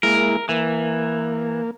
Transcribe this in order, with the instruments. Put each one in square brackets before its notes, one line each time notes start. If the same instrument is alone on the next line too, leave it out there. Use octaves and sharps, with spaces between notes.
[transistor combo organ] G#3 A#3 E4 [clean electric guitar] A#4
[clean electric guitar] E3 [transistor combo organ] A#3